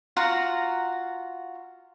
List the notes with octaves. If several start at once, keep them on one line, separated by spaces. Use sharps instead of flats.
F4 F#4 F#5 A#5